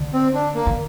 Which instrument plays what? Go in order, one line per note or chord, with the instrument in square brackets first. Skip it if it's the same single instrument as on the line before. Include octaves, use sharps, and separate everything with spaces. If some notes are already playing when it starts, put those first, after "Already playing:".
Already playing: [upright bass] D3
[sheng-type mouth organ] C4
D4
A#3
[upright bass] D3